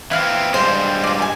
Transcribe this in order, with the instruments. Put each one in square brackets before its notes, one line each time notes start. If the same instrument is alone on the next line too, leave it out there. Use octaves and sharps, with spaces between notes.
[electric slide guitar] E3 C4 [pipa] E4 F5
[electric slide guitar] G2 G3 G#3 [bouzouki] C5
[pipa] F4 D5
G#5 A5